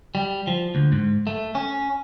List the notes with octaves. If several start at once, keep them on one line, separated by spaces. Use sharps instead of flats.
G3
F3
D2
G#2
A3
C#4